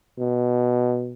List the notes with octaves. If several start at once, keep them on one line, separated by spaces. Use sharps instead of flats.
B2